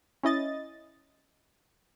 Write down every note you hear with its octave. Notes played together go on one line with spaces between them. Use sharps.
C#4 E4 D#5 A6